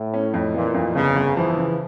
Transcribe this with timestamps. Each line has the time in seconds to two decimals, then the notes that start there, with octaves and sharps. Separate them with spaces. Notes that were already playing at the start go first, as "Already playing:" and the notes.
Already playing: A2
0.14 C#4
0.34 F2
0.54 A#2 E3
0.74 F2
0.95 G1 C#3
1.15 G1
1.36 E3 F3
1.56 C#3